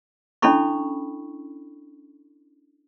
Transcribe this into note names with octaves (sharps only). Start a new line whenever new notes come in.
C#4 D4 E4 A4 B5 C#6